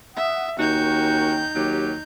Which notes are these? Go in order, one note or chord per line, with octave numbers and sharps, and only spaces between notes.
E5 F#5 D#6
D#2 C#4 D#4 F#4 A#4 G5 G6
D#2 F#3 G4